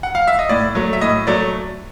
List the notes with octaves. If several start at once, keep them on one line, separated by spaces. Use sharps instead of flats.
F#5
F5
E5
D#5
A2 D5
F#3 A3
E5
A2 D#5
F#3 A3 D5